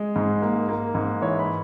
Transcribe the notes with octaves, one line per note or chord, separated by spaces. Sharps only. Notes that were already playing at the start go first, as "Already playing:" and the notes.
Already playing: G#3
G#2
A#3
A#3
G#2
E3 C#5
B5